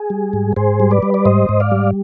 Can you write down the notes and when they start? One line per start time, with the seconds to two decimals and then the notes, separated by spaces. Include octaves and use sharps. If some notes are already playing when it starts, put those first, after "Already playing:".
Already playing: G#4
0.10 G3
0.33 G#2
0.56 G#2 G#4 C5
0.80 G3
0.91 B4 D5
1.02 G3
1.14 D5
1.25 G#2 C5 D#5
1.49 G#2
1.60 D5 F5
1.71 G3